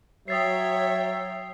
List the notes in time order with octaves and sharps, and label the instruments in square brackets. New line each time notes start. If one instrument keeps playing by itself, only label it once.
[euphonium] F#3 [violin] C#5 G5 [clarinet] E5 [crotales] D#6 A6 C7